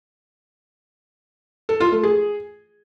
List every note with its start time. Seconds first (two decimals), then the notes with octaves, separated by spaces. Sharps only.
1.69 A4
1.80 F4
1.92 A3
2.03 G#4